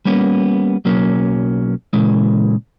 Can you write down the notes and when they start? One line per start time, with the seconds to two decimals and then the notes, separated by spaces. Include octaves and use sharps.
0.05 G3 A#3 B3 C#4
0.85 B1 F#3 A#3 C#4
1.93 A#2 C#3 E3 G#3